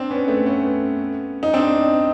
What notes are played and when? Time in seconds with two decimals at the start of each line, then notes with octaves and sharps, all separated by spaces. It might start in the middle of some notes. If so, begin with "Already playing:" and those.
Already playing: C4 D4
0.11 B3 C#4
0.28 A3 B3
0.46 B3 C#4
1.43 D#4
1.53 C4 D4